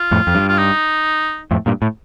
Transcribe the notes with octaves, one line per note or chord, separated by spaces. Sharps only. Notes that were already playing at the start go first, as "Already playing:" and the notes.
Already playing: F4
F2 A2
F2
G2
F4
D#4
F2 A2
G2 A#2
A2